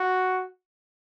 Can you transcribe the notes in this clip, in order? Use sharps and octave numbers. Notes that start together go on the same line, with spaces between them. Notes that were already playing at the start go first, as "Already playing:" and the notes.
Already playing: F#4